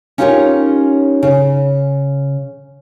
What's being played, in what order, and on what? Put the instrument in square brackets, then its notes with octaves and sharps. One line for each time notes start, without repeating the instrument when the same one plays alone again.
[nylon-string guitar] C#4 D#4 F4 G4 A#4 C#5
C#3